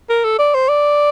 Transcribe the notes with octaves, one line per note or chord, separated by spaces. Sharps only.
A#4
A4
D5
C5
D5